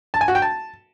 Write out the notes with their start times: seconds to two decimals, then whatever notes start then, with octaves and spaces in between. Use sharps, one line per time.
0.14 A5
0.21 G#5
0.28 F#4
0.35 G5
0.42 A5